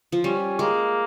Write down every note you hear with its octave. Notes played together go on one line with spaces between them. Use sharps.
F3
G3 C#4
G#3 A#3